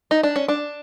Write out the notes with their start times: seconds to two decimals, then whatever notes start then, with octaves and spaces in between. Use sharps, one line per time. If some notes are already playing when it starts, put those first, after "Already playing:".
0.11 D#4
0.23 D4
0.36 C#4
0.48 D4